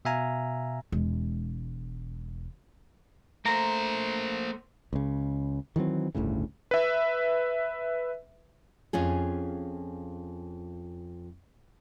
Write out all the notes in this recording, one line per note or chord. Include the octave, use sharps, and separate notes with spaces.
B2 E5 F5 G#5 A#5
E1 G#3
A3 A#3 C5 A#5
C#2 C#3
D#3 E3 F#3 C4
G1 D2 A2 C#3
B4 E5
F2 C#4 F4 G#4